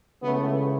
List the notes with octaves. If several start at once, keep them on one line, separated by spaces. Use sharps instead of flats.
C#2 C#3 E3 A3 B3